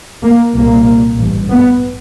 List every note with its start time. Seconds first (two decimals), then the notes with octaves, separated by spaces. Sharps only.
0.24 A#3
0.55 C2 A#2 A#3
1.18 A1 G2
1.50 B3